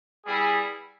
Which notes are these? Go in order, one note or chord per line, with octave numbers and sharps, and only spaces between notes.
G3 B3 E4 G#4